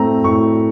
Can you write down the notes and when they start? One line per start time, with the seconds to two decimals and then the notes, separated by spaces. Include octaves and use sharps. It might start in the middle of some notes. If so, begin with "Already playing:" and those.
Already playing: A2 A3 C4 A#5
0.24 A2 C#6